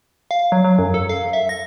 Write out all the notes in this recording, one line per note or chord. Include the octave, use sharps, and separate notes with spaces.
F5
F#3
F#3
F#2
A4
F5
E5
A#6